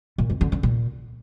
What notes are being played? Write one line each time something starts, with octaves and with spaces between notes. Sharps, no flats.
A#2
F2
D3
D3
A#2